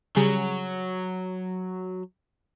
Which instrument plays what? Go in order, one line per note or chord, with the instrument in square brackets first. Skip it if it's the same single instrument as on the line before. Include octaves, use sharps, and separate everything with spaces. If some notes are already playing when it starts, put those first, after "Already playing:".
[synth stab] C#3 G3 G#4 [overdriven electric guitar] F#3